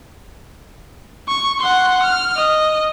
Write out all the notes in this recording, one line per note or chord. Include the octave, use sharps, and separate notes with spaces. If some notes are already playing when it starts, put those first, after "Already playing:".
C#6
F#5 C6
F6
D#5